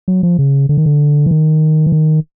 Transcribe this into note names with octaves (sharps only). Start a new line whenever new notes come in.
F#3
F3
C#3
D3
D#3
D3
E3
D#3
E3
D#3